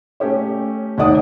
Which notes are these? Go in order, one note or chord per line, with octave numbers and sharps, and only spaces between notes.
A3 C#4 G4 C#5
D#2 D#3 A3 D5 F#5 D#6